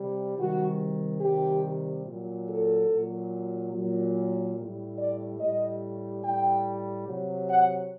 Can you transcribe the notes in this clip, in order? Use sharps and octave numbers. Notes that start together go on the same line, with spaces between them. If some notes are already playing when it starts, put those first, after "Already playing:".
Already playing: C3 G3
C3 D#3 G3 F#4
C3 D#3 G3 G4
A#2 F#3
A4
A#2 F#3
A#2 F#3
A2 G3
D5
A2 G3 D#5
A2 G3 G5
C3 F#3
F#5